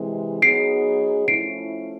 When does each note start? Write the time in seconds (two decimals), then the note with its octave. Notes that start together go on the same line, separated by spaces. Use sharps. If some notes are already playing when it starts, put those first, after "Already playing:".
Already playing: C3 E3 G#3
0.42 F#3 B3 D#4 G#4 C7 D7
1.28 F3 A3 C#4 E4 C7 D7